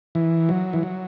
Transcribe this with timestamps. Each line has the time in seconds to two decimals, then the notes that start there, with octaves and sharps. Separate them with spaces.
0.15 E3
0.49 F#3
0.73 E3
0.83 F#3